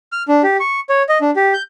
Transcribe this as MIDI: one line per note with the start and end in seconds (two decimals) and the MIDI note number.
0.12 0.23 89
0.28 0.42 62
0.43 0.57 67
0.60 0.80 85
0.89 1.03 73
1.09 1.18 75
1.21 1.30 62
1.36 1.53 67
1.54 1.62 91